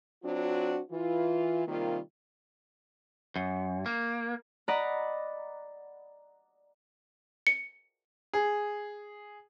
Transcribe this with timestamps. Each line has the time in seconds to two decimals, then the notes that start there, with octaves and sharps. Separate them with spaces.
0.23 F#3 C4 D4 F4 F#4
0.91 E3 F4
1.67 C3 D#3 G3 A#3 F4
3.36 F#2
3.86 A#3
4.68 D5 D#5 F#5 A#5 B5
7.47 C#7
8.33 G#4